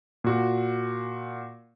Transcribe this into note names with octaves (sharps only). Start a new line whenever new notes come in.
A#2 F#4